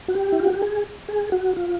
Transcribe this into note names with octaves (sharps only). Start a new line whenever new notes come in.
F#4
G4
E4
F4
F#4
G4
G#4
G#4
F#4
F4